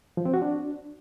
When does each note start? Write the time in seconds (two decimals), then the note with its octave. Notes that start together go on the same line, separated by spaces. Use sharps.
0.17 F3
0.25 C4
0.34 F#4
0.42 D4